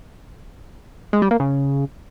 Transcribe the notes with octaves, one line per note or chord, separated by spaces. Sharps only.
G#3
G3
A#3
C#3